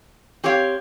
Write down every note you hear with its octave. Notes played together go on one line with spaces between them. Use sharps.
C4 G4 C#5 F5